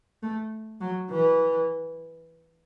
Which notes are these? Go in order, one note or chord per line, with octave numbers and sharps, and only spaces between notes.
A3
F#3
E3